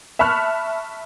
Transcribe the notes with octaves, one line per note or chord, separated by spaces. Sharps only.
E5 A5 B5 C#6 F6 F#6